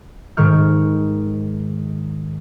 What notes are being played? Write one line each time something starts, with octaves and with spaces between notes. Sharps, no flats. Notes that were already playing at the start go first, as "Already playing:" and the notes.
G#2 D#3 C#6 F6 G6